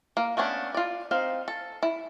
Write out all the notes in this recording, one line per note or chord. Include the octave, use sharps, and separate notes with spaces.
A#3
A3 B3 C#4 D4
F4 D5
C4 D#4 F5
A4
E4